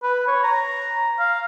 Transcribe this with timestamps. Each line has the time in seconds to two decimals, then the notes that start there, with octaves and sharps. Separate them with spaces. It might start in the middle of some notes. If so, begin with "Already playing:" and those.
0.03 B4
0.28 C#5
0.43 A#5
1.19 F5